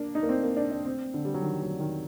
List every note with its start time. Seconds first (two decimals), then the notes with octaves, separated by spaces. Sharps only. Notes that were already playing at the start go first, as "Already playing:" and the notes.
Already playing: A#3 D4
0.15 D#4
0.23 A#3
0.29 C4
0.43 A#3
0.57 D4
0.72 D4
0.85 C4
1.14 D3
1.25 G3
1.34 F#3
1.42 D#3
1.62 F#3
1.80 D#3